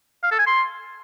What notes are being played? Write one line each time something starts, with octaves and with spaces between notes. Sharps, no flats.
F5
A4
G#5
C6